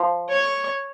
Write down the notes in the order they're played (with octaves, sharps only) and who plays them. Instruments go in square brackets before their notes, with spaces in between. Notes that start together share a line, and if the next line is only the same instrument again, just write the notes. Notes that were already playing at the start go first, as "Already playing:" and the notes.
Already playing: [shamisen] F3
[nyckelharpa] C#5